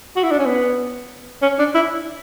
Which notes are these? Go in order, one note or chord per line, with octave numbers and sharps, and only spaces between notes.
F#4
E4
D4
C#4
B3
C#4
D4
E4